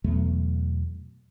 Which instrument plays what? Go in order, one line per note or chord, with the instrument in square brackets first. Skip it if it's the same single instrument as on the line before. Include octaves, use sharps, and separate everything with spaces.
[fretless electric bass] E2 B2 F#3 A3